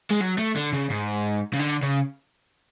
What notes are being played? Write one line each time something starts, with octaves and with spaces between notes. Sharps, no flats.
G#3
F#3
A3
D3
C#3
G#2
C#3
D3
C#3